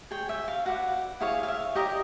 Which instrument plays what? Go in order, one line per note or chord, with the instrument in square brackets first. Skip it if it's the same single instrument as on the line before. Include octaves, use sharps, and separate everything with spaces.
[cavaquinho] G#4 C#5 G5
E5
F5
F#4 B4 D5 F#5
E4 G#4 C#5 F5
F5
E5
G4 A#4 D5 D#5